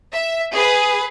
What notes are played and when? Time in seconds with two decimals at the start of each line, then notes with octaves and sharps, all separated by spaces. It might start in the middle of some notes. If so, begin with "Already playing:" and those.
0.11 E5
0.53 G#4 B4